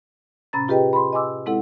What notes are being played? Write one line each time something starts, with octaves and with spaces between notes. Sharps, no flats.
A2 C3 C#4 A#5 B5 A6
F4 G4 G#4 B4 D#5 G5
B5 C6
D#5 G#5 C6 D6 E6
G#3 C4 E4 A4 F#5